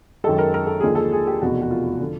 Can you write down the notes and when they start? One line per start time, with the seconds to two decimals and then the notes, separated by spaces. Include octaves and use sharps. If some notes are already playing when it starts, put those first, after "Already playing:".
0.24 F#2 D#3 G#3 A4
0.39 A#4
0.54 A#4
0.67 A4
0.81 D#2 D3 F3 G#3 G#4
0.95 A4
1.12 G#4
1.27 G4
1.42 F1 E2 B2 F#4
1.62 F#4
1.71 F4
2.00 D3 F3